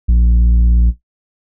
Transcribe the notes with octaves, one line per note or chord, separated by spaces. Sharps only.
A#1